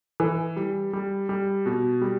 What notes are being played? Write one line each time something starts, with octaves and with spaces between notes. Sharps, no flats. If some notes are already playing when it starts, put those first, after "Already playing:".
E3
G3
G3
G3
B2
G3